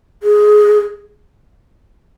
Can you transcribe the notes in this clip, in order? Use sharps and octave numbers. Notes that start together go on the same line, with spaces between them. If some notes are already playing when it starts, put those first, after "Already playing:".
G#4